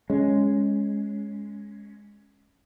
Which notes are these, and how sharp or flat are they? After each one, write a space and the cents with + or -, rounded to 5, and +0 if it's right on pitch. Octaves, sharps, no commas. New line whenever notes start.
G#3 +0 C#4 +0